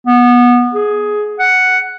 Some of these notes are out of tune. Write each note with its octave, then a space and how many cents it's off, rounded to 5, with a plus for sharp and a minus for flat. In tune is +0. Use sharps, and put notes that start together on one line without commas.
B3 -20
G#4 +10
F#5 +0